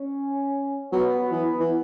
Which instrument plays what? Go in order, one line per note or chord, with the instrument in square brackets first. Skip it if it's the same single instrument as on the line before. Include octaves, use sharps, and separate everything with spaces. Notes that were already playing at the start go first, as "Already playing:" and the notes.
Already playing: [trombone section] C#4
[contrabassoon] F#3 [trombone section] B3
[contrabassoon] E3
E3